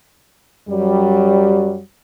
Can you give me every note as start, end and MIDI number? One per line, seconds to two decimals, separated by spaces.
0.69 1.79 42
0.69 1.79 54
0.69 1.79 55